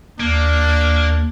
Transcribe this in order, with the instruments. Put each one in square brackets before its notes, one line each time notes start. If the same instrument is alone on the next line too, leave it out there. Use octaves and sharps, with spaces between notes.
[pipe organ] D#2 [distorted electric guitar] A#3 [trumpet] D4